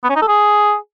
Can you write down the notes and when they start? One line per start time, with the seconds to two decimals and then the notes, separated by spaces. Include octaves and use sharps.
0.04 B3
0.10 C#4
0.16 D#4
0.22 A4
0.28 G#4